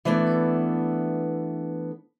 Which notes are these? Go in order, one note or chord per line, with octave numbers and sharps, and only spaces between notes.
E3 A3 B3 D4